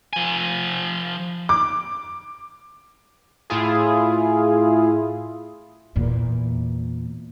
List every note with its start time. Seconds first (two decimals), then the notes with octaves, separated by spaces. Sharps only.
0.13 F3 G#5
1.49 D6
3.50 A2 E4 F4 G#4
5.96 E2 A#2